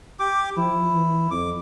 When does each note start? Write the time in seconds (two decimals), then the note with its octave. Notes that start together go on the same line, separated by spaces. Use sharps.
0.20 G4 D6
0.57 F3 E4
0.92 E3
1.31 F2 D6